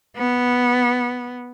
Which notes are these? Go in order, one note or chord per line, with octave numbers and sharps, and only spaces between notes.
B3